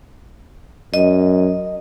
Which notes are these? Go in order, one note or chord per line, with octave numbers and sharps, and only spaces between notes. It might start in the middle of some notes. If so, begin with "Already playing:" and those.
F#2 D#5